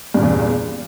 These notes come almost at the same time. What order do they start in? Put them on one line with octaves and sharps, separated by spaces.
G2 A#2 C#3 E2